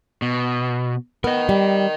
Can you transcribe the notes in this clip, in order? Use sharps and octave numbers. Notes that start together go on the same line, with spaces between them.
B2
B3 A#4 D#5
G3